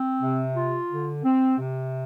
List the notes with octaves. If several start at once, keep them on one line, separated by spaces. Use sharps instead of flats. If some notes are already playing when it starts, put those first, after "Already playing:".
Already playing: C4
C3
F4
D3
C4
C3